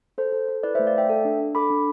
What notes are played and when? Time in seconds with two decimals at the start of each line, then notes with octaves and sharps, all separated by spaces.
0.18 A4 C5
0.32 A4
0.49 A4
0.63 E4 B4 D5
0.75 C5 E5
0.79 A3
0.87 D5 F5
0.95 A3 E5 G5
1.09 A4
1.25 D4
1.40 D4
1.55 A4 B5 D6
1.70 D4